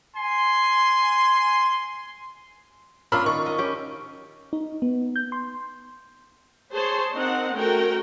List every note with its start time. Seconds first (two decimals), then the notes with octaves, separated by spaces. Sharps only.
0.16 G#5 C6
3.12 C#4 D4 F4 A#4 B5 E6 F6
3.26 D#3 C#6
3.46 D#5
3.58 C#4 G4
4.53 D#4
4.82 B3
5.16 G6
5.32 C6
6.74 G#4 C5 C#5 A5 C6
7.14 C4 D#4 A#4 F#5
7.56 A3 C#4 F#4 A#4 G5